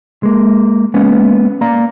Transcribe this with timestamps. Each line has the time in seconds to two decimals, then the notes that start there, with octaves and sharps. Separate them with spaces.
0.23 G#3 A#3
0.94 G#3 A#3 B3 C#4
1.61 A#3 D5 F5 A#5